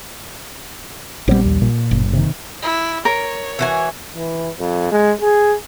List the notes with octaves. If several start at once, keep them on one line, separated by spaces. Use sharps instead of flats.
A#1 G3 B3 C4
D#2
A#2
F#1
C3 D#3
E4
A#4 C#5
E3 F#4 G#5
E3
F2
G#3
G#4